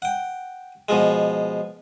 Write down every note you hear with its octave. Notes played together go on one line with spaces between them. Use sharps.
F#5 G5
B2 F3 G#3